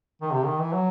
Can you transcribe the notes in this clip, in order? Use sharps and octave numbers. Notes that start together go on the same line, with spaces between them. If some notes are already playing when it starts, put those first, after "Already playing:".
D#3
C3
D#3
E3
F#3